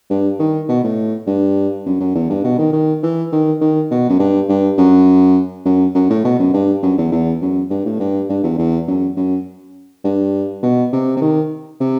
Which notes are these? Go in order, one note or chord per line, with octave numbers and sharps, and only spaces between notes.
G2
D#3
B2
A2
G2
F#2
F#2
E2
G2
B2
D#3
D#3
E3
D#3
D#3
B2
F#2
G2
G2
F#2
F#2
F#2
A2
B2
F#2
G2
F#2
E2
E2
F#2
G2
A2
G2
G2
E2
E2
F#2
F#2
G2
B2
C3
C3
D#3
C3